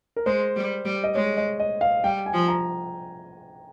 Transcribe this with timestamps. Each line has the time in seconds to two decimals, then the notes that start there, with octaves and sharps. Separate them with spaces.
0.16 A#4
0.26 G#3 C5
0.56 G3
0.85 G3
1.04 D#5
1.15 G#3 C#5
1.37 D#5
1.59 D#5
1.81 F5
2.04 G3 G5
2.26 G#5
2.34 F3
2.48 A#5